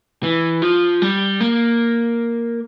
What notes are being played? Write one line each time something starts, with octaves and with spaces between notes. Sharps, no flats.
E3
F3
G3
A#3